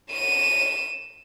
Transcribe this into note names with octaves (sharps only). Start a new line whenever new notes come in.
D#7 E7